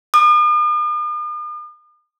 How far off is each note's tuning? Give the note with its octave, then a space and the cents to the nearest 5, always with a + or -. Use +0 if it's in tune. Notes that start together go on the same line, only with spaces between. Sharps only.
D#6 -45